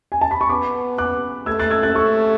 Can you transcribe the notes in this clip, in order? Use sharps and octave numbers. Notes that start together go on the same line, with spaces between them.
G#5
A5
B5
C#6
B3 B5 D6
D6 F#6
A3 E6 G#6
F#6 A6
E6 G#6
F#6 A6
A3 C#6 E6